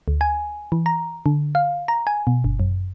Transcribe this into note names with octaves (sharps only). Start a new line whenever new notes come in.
D2
G#5
E3
A#5
D3
F5
A#5
G#5
B2
G1
F#2